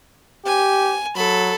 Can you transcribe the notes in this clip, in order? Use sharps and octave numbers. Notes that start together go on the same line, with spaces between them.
G4 G#5
F#3 A4 B5